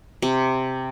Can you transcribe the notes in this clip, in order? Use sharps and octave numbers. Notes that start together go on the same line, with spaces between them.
C3